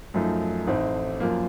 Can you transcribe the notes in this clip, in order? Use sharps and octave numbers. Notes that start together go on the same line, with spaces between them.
F#2 F3 A3 D#4
A1 A2 A3 C4 D#4
F#2 F3 A#3